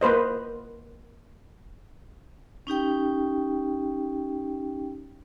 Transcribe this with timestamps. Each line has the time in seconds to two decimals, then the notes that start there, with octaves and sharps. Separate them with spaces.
0.01 A#3 B4 C5 D#5
2.67 C#4 D#4 G4 G5